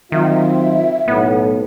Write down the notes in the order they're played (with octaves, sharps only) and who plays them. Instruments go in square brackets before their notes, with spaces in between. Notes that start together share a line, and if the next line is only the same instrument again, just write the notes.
[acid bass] D#3 [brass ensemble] F#3 C4 F4 [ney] E5
[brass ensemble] B1 A2 [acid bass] B3